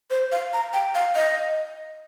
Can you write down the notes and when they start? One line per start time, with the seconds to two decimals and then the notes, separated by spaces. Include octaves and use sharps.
0.10 C5
0.32 F5
0.53 A#5
0.73 G5
0.95 F5
1.16 D#5